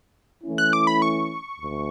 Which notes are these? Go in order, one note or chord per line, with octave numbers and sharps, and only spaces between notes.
E3 A3 C#4 E4
F#6
D6
B5
C#6
D2